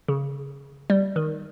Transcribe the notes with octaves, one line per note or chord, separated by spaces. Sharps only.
C#3
G3
D#3